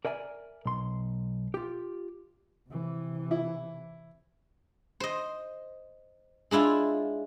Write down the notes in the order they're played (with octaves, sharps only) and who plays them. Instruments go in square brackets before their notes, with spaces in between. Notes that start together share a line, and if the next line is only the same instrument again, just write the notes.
[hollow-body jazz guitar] A#4 D5 E5 G#5
B1 C6
F4 G4
[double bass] C3 E3
[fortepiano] E4
[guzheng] C5 D#5
G#3 D4 E4 F4